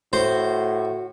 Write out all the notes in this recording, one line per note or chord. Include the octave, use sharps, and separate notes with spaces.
A2 F#4 C5